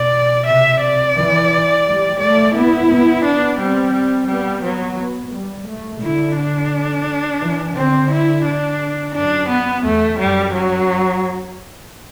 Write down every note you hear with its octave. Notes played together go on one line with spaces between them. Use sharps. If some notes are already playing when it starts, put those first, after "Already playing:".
Already playing: B2 D5
C3 E5
D5
E3
G3
A3 D5
B3 E4
B3
D4
G3 C4
G3
G3 B3
F#3 B3
B3
G3
A3
D3 E4
D4
E3
D3 C4
E4
D4
F#2 D4
B3
E2 A3
F#2 G3
F#3